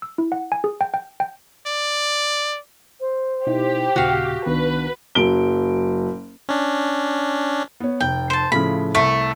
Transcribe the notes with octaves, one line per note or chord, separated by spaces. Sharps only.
E6
E4
F#5
G#5
G#4
G5
G5
G5
D5
C5
B2 D#4 E4 G4
D#2 A#2 C#3 F#4 F5
C2 D#3 B3 D4 B4
F#1 F#3 D7 G7
C#4 D4
B3 C#5
F1 G5
C5 A5
A2 C#3 F3 B5
C2 A3